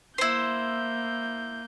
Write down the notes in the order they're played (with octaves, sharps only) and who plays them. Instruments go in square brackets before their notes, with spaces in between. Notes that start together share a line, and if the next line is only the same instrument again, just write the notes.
[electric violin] A#3 G6 [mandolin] E4 C5